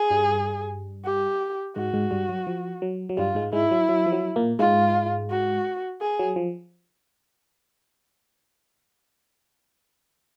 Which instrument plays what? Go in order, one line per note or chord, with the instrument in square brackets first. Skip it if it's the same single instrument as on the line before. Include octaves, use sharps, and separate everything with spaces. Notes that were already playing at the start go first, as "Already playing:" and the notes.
Already playing: [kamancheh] G#4
[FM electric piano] G2 G3
[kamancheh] G4
[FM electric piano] G#2 G#3 [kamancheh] F#4
[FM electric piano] G#2 G#3
G2 G3
F#3
F3
F#3
F#3
[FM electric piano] G2 G3 [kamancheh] F4
[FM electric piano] G#2 G#3
[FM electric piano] G#2 G#3 [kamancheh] E4
[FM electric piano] F#3
F#3
F3
F#3
A#2 A#3
[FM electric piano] G#2 G#3 [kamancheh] F4
[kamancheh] F#4
G#4
[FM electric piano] F#3
F3